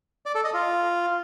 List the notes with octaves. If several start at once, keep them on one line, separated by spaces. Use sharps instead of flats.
D5
A4
D#5
F4